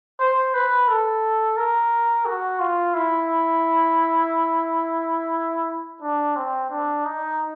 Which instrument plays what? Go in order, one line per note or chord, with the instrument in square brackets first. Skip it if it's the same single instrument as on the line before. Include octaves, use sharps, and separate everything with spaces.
[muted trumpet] C5
B4
A4
A#4
F#4
F4
E4
D4
C4
D4
D#4